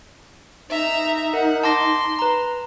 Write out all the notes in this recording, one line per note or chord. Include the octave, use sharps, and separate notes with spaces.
D#4 E5 A#5
A#4 F#5
A5 C6 D6 A#6
B4 A#5